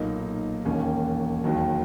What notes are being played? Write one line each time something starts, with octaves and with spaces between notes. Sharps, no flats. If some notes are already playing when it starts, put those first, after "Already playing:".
Already playing: B1 A#2 A#3 D#4
E1 D#2 D#3 A#3 C#4
E1 D#2 D#3 F#3